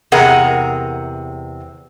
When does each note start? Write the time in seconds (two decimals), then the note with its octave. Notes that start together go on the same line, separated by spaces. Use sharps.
0.12 E2 C3 G#4 A#4 F#5 A#5